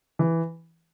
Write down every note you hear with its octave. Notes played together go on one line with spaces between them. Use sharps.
E3